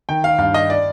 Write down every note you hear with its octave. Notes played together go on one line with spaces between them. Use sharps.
D#3 G5
F5
G2 F5
D#5
D5